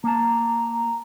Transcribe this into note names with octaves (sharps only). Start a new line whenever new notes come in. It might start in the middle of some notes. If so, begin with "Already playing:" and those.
A#3 A5 A#5